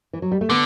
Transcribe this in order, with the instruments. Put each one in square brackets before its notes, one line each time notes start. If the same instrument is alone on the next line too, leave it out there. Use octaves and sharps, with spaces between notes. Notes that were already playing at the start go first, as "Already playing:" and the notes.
[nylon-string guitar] E3
F#3
G3
A3
[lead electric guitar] D3 [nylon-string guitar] B3